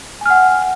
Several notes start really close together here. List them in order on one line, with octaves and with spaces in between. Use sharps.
G#5 F6 F#5